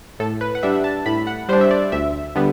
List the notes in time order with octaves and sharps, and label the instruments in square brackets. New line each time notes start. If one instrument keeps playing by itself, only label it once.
[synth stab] A2 A4
B4
F#5
G3 D4 E5
A5
A2 B5
F#5
G3 C5
D4
E5
D5
D2 E5
D3 G3 B3